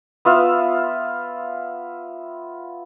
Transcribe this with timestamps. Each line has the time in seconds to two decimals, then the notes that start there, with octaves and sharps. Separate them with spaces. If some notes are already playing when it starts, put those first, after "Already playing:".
0.25 B3 F4 E5 F5